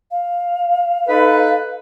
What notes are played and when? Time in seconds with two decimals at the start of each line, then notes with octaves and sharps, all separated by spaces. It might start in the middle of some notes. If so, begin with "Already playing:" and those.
0.11 F5
1.08 D#4 A4 B4